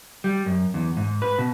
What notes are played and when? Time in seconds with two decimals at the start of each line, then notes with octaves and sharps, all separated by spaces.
0.24 G3
0.46 F#2
0.74 E2
0.97 G#2
1.22 B4
1.38 B2